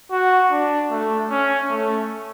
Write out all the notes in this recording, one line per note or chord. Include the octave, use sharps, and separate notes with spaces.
F#4
D4
A3
C#4
A3